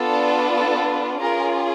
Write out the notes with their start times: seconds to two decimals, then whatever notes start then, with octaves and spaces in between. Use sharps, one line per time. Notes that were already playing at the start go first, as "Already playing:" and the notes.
Already playing: B3 D4 F4 A4
0.56 A4
1.21 C#4 F4 G#4 A#4